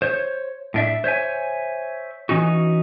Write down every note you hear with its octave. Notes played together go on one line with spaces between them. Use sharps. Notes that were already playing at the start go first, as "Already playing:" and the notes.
C5 C#5
A2 D4 E5
C5 C#5 E5 G#5
E3 C#4 D#4 F#4